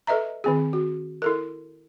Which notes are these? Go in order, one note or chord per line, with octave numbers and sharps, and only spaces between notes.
A4 B4 D#5 E5 A#5
D#3 C4 G#4
F#4
E4 A4 A#4